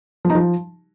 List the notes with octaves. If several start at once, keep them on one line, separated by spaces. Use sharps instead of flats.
F3
D#4
F3